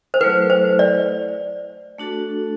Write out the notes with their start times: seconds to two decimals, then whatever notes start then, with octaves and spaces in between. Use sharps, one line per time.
0.14 C5
0.20 F#3 A3 E4 A4 B4
0.50 C5
0.79 D5
1.98 A3 D4 F#4 A4